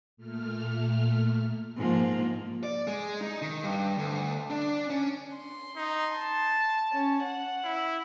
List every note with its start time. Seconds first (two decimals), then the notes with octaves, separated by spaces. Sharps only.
0.17 A#2 A3 F6
1.77 G#2 F3 A#3
2.63 D5
2.87 G#3
3.20 D#4
3.42 D#3
3.63 G2
3.98 D2
4.51 D4
4.90 C#4
5.36 C6
5.76 D#4
6.11 A5
6.92 C#4
7.23 F#5
7.64 E4